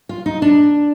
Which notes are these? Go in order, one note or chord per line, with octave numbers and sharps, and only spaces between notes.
F4
D#4
D4